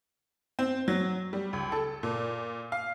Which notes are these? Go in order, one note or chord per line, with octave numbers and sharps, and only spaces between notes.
C4
F#3
G3
C#2
A4
A#2
F5